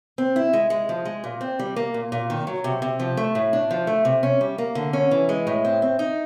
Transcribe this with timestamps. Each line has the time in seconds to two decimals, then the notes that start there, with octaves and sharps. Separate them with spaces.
0.18 C4
0.36 E4
0.53 G#3
0.70 G#3
0.89 F3
1.05 G#3
1.24 A#2
1.41 C4
1.59 G3
1.76 A#3
1.94 A#2
2.12 A#2
2.30 D#3
2.47 F#3
2.64 C3
2.82 C3
3.00 F3
3.17 A3
3.35 A2
3.53 D4
3.71 F3
3.87 A3
4.05 C3
4.23 C#4
4.41 G3
4.58 A#3
4.75 D3
4.93 C#4
5.11 E3
5.29 G#3
5.47 A2
5.65 C4
5.82 C4
5.99 D#4